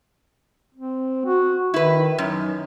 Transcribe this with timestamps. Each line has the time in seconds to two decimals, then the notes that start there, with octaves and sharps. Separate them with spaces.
0.75 C4
1.25 F#4
1.74 D#3 E4 B4
2.18 F#2 D#4